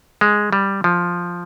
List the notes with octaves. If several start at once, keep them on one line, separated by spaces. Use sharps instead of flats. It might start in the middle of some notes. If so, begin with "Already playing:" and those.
G#3
G3
F3